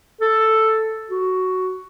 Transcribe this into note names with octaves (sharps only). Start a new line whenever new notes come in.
A4
F#4